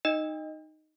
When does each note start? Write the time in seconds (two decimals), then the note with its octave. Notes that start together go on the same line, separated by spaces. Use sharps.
0.05 D#4 D#5